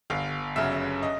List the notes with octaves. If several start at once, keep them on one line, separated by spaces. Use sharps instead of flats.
G1 F5
F#2 C#3 E5
D#5